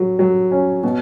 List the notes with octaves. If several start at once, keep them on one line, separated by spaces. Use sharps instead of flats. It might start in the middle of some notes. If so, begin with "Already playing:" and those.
Already playing: F#3
F#3
C#4
B2